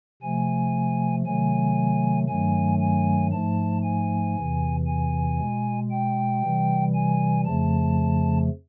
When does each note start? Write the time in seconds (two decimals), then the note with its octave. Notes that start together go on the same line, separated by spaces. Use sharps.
0.22 C3 F3 A3 G#5
1.26 C3 D#3 F#3 A3 G#5
2.28 G2 D#3 F#3 A3 G#5
2.81 G#5
3.32 G#2 F3 A3 A5
3.83 G#5
4.36 E2 C3 E3
4.87 G#5
5.39 B2 G#3
5.91 G5
6.42 C3 E3 G3
6.95 G#5
7.46 F2 C#3 F3 A3 A5